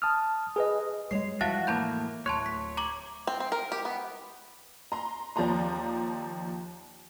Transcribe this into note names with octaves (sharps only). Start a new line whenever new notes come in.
A5 D#6 F6
G#4 B4 D#5
F#2 G3 G#3 C#5 C7
F2 E3 F#4 E5 F5 A5 A6
A2 A#3 A5 B5 G6
D1 C#5 A5 C6 F#6
B6
A#5 D6 F#7
C4
C4
A#4
G4
B3
A#5 C6
D#2 F3 D5 A#5 C6